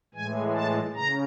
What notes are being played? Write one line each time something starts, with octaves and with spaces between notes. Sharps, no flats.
A2 E3 G#3 G#5
A5
C#3 A#5